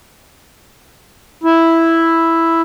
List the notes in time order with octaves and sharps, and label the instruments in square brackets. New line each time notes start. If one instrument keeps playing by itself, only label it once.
[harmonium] E4